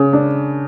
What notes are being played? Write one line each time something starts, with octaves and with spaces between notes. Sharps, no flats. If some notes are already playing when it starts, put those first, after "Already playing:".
Already playing: C#3
D4